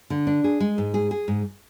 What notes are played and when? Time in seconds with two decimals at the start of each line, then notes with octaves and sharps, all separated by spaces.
0.10 D3
0.27 D4
0.44 G#4
0.60 G#3
0.78 G#2
0.94 G#4
1.11 G#4
1.28 G#2